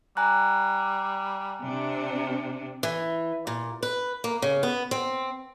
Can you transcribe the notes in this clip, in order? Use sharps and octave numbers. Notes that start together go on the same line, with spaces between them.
G3 G#5 A#5 F#6
C3 D4
E3
A#2
B4
A#3
C#3
B3
C4